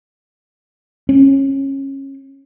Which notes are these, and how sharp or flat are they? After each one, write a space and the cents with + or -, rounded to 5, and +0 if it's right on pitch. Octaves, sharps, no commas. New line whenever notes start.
C#4 -25